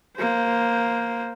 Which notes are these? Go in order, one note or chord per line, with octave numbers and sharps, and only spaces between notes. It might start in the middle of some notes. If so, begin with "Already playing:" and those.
A#3 C5